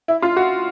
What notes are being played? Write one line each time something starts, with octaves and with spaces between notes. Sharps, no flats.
E4
F4
F#4